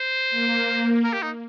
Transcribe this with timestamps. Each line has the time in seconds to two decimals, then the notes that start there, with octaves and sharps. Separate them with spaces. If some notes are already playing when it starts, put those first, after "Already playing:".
Already playing: C5
0.30 A#3
1.04 A#4
1.13 G4
1.22 D#4